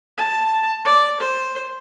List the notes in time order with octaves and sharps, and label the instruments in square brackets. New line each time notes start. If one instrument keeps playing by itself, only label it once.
[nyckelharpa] A5
D5
C5